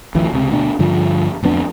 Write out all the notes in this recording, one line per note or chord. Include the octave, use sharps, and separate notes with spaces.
A1 D2 E3 F#3
C#2 C3
D2 B2 D4
G2 D3 F3
D1 F2 B3 D4